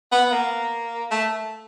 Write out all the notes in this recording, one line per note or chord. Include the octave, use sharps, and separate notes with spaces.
B3
A#3
A3